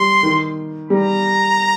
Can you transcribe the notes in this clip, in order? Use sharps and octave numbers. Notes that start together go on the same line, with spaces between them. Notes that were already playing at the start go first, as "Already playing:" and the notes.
Already playing: G3 C6
D#3
G3 A#5